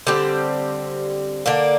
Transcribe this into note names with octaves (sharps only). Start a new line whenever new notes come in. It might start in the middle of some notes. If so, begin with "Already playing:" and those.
D3 G3 C4 G4
D3 A#3 D4